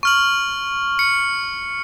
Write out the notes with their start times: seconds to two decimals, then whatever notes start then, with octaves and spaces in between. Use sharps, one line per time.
0.03 C#6 F6 F#7
0.99 C#7